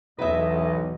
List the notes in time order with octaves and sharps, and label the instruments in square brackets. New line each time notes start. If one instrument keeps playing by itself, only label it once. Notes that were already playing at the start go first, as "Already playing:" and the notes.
[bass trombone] B1 [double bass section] E2 [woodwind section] A2 B3 D#5 [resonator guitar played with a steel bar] B4 E5